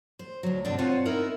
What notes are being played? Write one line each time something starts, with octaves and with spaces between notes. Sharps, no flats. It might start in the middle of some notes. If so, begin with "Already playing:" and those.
C5
D2 F#3
G2 B2 D3 C4 D4
C4 F4 C5 C#5 F#5 G#5
B3 D#4 E4 A#4